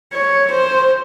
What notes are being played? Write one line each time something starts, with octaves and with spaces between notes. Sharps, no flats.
C#5
C5